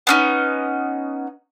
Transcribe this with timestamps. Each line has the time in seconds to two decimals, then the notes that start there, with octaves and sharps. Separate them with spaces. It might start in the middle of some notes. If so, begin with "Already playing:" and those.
0.07 B3 C#4 D#4